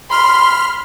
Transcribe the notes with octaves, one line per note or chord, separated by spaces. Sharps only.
B5 C6 F6